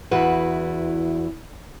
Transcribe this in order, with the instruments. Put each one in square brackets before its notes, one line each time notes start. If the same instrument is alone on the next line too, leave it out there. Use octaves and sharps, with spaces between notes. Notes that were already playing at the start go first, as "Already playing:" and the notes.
[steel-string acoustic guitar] E2 E4 F#4 B4